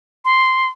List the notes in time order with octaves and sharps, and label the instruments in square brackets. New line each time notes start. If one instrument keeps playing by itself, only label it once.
[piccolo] C6